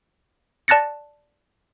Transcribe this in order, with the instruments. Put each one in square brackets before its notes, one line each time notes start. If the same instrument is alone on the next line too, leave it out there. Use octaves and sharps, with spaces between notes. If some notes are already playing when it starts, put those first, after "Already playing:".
[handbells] D5 A5 F#6 A6 A#6 C#7